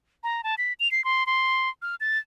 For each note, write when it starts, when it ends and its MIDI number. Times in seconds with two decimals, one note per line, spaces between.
0.24 0.42 82
0.44 0.55 81
0.58 0.73 95
0.80 0.91 101
0.91 1.04 96
1.05 1.26 84
1.26 1.69 84
1.82 1.95 89
2.00 2.18 93